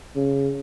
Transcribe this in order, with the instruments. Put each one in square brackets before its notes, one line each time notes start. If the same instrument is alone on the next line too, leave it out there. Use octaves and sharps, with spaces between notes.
[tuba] C#3